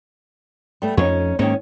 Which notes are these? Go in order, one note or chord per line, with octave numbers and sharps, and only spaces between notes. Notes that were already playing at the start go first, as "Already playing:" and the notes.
G3 A3 B3
F2 C#4 D#4 C#5
G#2 D#3 A#3 C#4